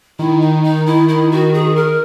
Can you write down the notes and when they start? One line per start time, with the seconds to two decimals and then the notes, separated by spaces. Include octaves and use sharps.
0.19 D#3 E4
0.41 D#4
0.64 D#4
0.86 E4
1.08 E4
1.31 F#4
1.53 G#4
1.76 A#4